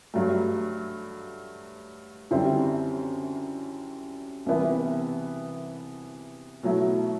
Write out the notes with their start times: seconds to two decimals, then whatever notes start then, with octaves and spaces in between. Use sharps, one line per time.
0.14 G2 F#3 A3
2.31 F#2 D3 G3 C4 E4
4.46 C2 C3 E3 B3 E4
6.63 B2 F#3 A3 E4